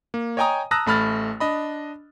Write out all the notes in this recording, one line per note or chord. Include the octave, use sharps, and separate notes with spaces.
A#3
C#5 D#5 G5 G#5 A#5 D#6
A5 A#5 D#6 E6 F#6 A#6
A1 A3 B5 F6 A6
D4 D#5 B5